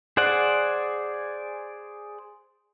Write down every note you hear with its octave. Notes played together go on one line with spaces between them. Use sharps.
G#4 C5 D5 F#5